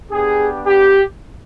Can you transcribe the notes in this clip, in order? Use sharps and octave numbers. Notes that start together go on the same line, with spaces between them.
B3 D4 G4 G#4
G4